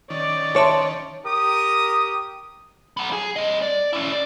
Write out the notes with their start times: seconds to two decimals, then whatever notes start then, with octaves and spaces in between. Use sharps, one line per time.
0.10 D#3 C#4 D5
0.56 C#5 E5 A5 C6
1.25 G4 A#4 D#6
2.97 F#3 B3
3.13 G#4
3.36 C4 D#5
3.62 D5
3.93 C#4 E4
4.12 D5